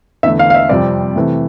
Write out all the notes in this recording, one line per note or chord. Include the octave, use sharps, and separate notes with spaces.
E2 D3 A3 E5
F5
F5
E5
F2 C3 G3 C4 D5
C3 E3 A3